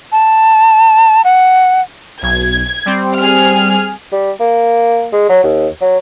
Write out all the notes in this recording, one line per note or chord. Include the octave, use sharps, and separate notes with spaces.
A5
F#5
B1 G#6
G3 C4
G#4 F6
G3
A#3
G#3
F#3
D#2
F#3